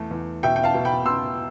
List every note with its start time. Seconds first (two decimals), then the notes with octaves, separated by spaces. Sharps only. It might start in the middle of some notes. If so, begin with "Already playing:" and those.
Already playing: E2 A3
0.11 E2
0.43 B2 E5 G5
0.56 G5
0.63 F5 A5
0.74 B2
0.85 G5 B5
1.06 B2 C6 E6